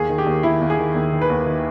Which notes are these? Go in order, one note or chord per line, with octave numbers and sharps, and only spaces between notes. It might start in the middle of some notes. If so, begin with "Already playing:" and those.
Already playing: D#2 G#4
D#3
G4
D#2
D#3 E4
D#2
G#4
D#3
D#2
D#3
B4
D#2
D#3